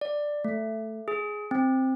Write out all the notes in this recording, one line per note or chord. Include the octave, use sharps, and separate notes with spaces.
D5
A3
G#4
C4